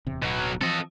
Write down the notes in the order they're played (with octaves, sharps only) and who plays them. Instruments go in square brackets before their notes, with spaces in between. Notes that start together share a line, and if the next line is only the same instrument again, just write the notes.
[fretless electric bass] D1 E2 C3
[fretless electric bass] D1 [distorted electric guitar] B2 F#3
[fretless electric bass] E3 F3 C4 [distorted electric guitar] A4 D#5